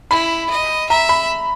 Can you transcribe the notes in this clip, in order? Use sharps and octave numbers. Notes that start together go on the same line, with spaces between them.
E4 B5
D#5
E5 A#5
B5